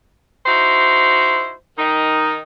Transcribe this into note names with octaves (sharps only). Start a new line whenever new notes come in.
D#4 E4 F#4 C5
D#3 D#4